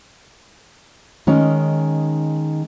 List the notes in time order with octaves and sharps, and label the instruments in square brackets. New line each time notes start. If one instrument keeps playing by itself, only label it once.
[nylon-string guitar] D#3 G#3 C#4 D#4